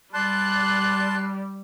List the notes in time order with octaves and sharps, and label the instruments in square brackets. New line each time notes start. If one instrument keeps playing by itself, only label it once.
[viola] G3 [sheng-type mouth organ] D5 A5 C6 [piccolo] F#6